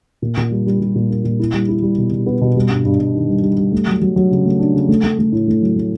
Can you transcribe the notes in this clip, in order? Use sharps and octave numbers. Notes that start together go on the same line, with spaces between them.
A#2
A#2
G3
G3
G3
A#2
A#3
A#2
E4
G3
E4
G3
B2
B2
B3
B2
G3
G2
G2
G2
D#3
G3
G3
G3
A3
F#3
F#3
F#3
C#3
A3
D4
C#3
A3
A3
A3
A2
A3
F#3
A3